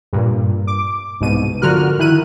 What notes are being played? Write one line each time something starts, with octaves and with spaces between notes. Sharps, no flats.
G2 A#2
D6
C2 G#2 B2 D#7
D3 F3 F#4 A#4 F6 F#6
D#3 E4 F#6 D#7